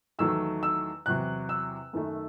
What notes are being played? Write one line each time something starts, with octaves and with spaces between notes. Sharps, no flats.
E2 D#3 F#3 A3 E6
E6
E2 C3 F#3 F#6
E6
F#2 D#3 A3